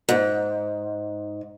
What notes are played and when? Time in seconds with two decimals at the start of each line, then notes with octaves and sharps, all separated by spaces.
0.09 G#2